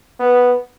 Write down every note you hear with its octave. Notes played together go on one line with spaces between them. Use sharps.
B3